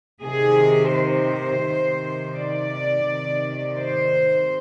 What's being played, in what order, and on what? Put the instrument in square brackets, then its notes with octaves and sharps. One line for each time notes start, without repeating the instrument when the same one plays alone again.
[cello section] C3 D#3 G#4
C5
C3 D#3
D5
C3 D#3
C5